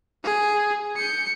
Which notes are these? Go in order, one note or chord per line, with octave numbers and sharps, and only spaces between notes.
G#4
G6 C#7